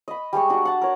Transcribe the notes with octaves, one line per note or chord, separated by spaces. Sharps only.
D#5 B5
G3 G#3 G5 C#6
D4 F#4
F#5 A5
A#4 C#5